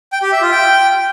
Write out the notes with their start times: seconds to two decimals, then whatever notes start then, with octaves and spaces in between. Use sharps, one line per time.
0.12 G5
0.22 G4
0.32 E5
0.42 F4
0.51 G5